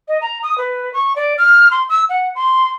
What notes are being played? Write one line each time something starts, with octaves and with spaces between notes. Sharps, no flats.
D#5
A#5
D#6
B4
C#6
D5
F6
C6
E6
F#5
C6